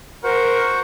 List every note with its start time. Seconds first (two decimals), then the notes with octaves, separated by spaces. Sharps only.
0.24 F#4 A#4 C5 F#5